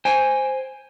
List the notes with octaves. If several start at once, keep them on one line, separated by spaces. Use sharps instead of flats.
C5 G5 G#5